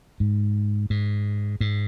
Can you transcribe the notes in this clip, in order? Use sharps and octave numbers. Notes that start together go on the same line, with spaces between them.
G#2
G#2
G#2